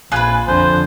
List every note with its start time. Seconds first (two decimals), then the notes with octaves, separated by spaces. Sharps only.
0.12 A#1 F4 B4 G#5 F#6 G#6
0.48 F2 D3 C5